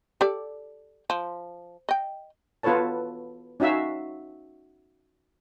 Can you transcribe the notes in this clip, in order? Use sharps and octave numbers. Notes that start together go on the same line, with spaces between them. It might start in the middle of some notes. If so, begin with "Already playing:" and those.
G4 A4 D5
F3
D#5 G5
B3 F4 A4 B4 C#5 A5
C#4 D#4 F#4 E5 F5